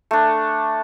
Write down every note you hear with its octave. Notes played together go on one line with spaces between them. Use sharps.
A3 D4